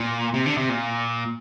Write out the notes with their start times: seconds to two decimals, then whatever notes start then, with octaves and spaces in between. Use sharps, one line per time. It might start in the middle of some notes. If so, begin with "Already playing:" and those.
Already playing: A#2
0.34 C3
0.46 D3
0.57 C3
0.69 A#2